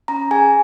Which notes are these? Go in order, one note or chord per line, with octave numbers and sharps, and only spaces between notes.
C#4 A#5
G#4 G#5